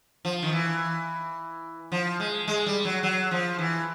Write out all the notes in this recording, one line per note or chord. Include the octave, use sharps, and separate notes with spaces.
F3
D#3
E3
F3
G#3
G#3
G3
F#3
F#3
F3
E3